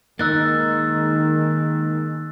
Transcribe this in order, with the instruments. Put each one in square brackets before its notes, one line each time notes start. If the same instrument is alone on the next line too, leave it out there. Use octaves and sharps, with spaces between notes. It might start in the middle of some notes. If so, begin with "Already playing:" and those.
[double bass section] D#3 G#3 [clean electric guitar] A#3 D#4 [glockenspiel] E6 F#6 A6